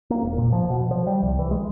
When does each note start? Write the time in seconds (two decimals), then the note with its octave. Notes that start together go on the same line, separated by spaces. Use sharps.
0.10 A#3
0.23 E1
0.38 A#2
0.52 F3
0.70 B2
0.91 F3
1.07 G3
1.22 C2
1.39 E3
1.51 G#3